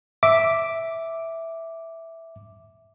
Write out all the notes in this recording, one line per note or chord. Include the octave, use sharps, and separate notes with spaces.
E5 D6